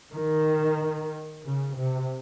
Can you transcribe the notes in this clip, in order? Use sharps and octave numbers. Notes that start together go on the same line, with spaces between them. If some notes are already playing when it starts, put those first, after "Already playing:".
D#3
C#3
C3